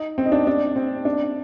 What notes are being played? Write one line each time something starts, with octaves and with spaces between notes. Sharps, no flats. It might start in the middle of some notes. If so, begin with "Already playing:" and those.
Already playing: D#4
C4
D#4
D4
D4
C4
D4